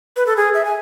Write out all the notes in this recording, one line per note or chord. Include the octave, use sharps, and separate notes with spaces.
B4
A4
G#4
E5
G#5